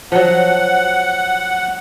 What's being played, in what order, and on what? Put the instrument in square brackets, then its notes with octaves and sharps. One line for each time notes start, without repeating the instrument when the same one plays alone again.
[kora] F3 F#3 [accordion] F#5